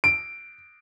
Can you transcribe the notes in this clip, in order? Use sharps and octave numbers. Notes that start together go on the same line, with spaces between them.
D7